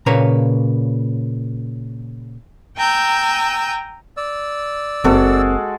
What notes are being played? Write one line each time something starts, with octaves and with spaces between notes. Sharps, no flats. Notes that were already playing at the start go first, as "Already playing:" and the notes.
A#2 C#3 A#3 B4 C#5 A#5
G5 G#5 A#5 E6 G6
D5 E6
F#1 G#3 A#3 C4 F#4 A4